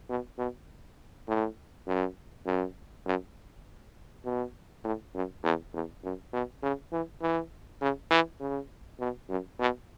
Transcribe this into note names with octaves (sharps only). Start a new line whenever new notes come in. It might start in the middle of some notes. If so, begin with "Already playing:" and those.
B2
B2
A2
F#2
F#2
F#2
B2
A2
F#2
E2
E2
F#2
B2
C#3
E3
E3
C#3
E3
C#3
B2
F#2
B2